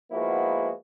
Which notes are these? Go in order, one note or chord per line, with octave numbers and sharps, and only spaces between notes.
F3 G#3 A#3 B3 E4 F#4